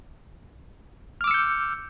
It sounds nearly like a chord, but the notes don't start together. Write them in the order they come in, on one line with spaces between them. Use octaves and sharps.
F6 D6 E6 C#7 G6